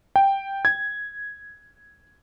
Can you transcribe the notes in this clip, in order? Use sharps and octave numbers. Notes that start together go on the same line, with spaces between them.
G5
G#6